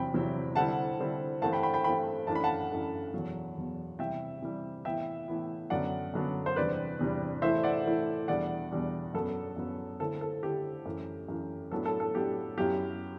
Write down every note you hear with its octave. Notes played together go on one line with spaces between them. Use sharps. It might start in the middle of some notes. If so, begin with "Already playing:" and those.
Already playing: E2 C3 F#3 C4 E4 G5 B5
E2 C3 F#3 C4 E4
D3 G3 C4 E4 F#5 A5
D3 G3 C4 E4
G2 E3 A3 C4 F#5 A5
G5 B5
G5 B5
G5 B5
G2 E3 A3 C4 G5 B5
F#2 E3 A3 D4 A5
B5
F#5 A5
F#2 E3 A3 D4
E2 B2 F#3
E2 B2 F#3
C3 E3 G3 E5 G5
C3 E3 G3
A2 E3 B3 E4 E5 G5
A2 E3 B3 E4
F#2 D3 F#3 B3 D4 D5 F#5
F#2 D3 F#3 B3 D4
C5
E2 C3 G3 D4 B4 D5
E2 C3 G3 D4
A2 E3 A3 E4 C5 E5
D5 F#5
A2 E3 A3 E4
E2 B2 G3 D4 D5 F#5
E2 B2 G3 D4
F#2 F#3 B3 A4
F#2 F#3 B3
D3 A3 C4 E4 A4
A4
D3 A3 C4 E4 G4
F#2 E3 A3
F#2 E3 A3
A2 F#3 B3 D4 A4
A4
A4
A2 F#3 B3 D4 G4
F#2 F#3 B3 E4 G4